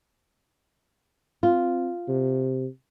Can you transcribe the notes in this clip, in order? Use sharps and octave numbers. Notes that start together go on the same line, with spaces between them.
C4 F4
C3